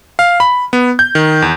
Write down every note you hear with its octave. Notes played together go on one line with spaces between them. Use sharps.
F5
B5
B3
G6
D#3
E2